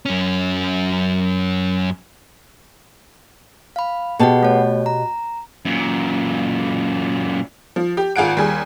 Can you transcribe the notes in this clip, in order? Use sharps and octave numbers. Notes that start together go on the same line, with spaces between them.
F#2 C#4
F5 B5
B2 G4 G#4 B4 F#5 A5
A3 C#5
A#5
F#2 A#2
F3
G4
G#1 F4 G#4 F#5 D7
D#2 G3 G#4